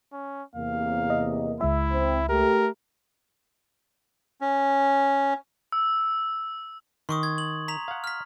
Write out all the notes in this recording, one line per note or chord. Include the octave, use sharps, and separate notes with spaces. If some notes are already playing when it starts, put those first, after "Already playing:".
C#4
E2 C3 A#3 F5
D#5
C#2 G#3 E4 E5
C4
A3 G4 A#4
C#4
E6
D#3 C6 C#6 D#6
G#6
F#7
A#5 B6 F7
F5 F#5
F6 B6